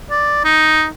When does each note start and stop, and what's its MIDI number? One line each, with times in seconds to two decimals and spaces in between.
0.11 0.44 74
0.44 0.87 63